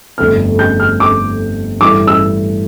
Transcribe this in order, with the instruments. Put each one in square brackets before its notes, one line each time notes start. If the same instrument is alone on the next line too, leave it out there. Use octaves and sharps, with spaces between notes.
[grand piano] G1 F2 D3 A3 [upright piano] F6
[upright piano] G6
F6
D6
[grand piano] A1 G2 E3 A3 [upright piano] D6
[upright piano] E6